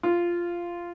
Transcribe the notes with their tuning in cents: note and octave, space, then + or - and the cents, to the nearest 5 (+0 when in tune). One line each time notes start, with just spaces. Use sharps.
F4 -10